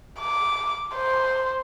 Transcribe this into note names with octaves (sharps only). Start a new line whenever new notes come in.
D6
C5